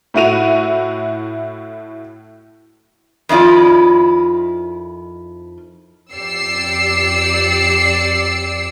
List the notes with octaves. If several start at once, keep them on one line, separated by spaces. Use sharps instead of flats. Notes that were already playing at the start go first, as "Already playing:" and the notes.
A2 A3 E4 F#4 D#7 F7
F2 D#3 E4 F4 D5
F2 G4 D5 E6 C7 C#7